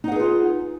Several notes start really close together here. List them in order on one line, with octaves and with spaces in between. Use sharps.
D#4 F#5 G#4 B4 F4